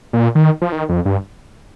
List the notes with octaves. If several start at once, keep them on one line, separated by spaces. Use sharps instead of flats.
A#2
D#3
F3
D#3
F2
G2